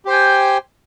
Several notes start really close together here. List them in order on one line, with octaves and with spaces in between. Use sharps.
G4 C5 G5 G#5